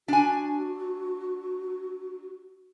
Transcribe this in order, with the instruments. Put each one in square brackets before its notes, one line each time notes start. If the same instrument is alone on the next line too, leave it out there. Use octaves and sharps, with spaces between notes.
[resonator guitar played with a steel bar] D4 G#5 [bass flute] F#4